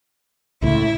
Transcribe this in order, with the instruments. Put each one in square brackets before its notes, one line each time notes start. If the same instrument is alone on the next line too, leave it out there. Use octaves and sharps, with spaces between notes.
[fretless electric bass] C#2 A2 [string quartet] E4